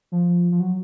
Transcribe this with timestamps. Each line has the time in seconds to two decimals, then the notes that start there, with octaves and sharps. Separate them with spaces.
0.12 F3
0.52 F3
0.60 F#3